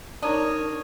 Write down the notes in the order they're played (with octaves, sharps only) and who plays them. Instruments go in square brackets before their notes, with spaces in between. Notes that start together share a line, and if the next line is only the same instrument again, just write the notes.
[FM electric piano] D4 [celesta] D#4 A#5 D#7 [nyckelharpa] A#4 C#5 [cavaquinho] D#6